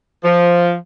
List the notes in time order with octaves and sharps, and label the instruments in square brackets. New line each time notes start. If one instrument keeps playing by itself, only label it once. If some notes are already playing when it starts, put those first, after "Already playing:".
[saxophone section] F3